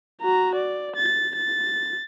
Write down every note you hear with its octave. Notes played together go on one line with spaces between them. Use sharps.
F#4 A#5
D5
A6
A6